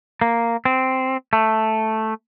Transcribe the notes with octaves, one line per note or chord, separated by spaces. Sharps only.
A#3
C4
A3